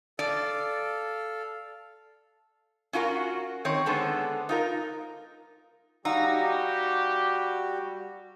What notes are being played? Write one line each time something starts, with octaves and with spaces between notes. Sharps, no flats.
A4 D5 F5
C#4 F4 F#4 A#4
D#3 C4 C#5
D3 G#3 B3 A4 C5
D#4 F4 A#4
G3 D#4 F#4 G4 F5 F#5 E6